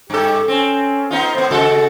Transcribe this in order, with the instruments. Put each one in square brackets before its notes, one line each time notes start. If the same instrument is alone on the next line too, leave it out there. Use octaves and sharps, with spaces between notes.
[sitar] G2 A4 [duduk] G4
[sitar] C4 [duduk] C#4
[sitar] B3 D#4 F4
[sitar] A2 B3 [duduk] C5
[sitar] C#3 G#3 A4 [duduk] F#4